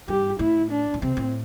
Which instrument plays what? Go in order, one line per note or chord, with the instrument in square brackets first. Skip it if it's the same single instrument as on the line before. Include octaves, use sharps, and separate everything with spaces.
[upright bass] G2 [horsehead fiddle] G4
[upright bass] A2 [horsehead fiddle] E4
[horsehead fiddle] D4
[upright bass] A2
[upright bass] C3 [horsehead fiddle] C4
[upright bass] A2